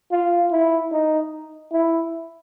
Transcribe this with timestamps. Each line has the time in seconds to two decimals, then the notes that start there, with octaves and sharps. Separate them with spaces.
0.12 F4
0.51 E4
0.92 D#4
1.72 E4